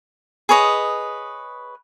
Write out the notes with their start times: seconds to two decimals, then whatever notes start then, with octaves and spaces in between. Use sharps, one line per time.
0.49 G#4 B4 C#5 D#5